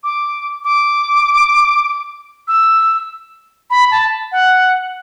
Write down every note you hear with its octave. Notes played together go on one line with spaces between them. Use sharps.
D6
D6
E6
B5
A5
F#5